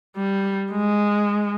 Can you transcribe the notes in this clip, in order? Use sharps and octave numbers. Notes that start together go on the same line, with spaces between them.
G3
G#3